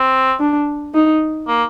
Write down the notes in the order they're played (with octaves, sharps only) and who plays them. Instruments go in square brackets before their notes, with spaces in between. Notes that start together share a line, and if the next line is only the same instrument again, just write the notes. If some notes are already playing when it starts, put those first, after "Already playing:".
Already playing: [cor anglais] C4
[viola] D4
D#4
[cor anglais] A#3